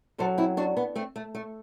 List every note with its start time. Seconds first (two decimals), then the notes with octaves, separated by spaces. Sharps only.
0.18 F#2 F#3 A4 C5
0.38 C4 E4
0.57 D4 F#4
0.77 B3
0.96 A3 C4
1.16 A3
1.35 A3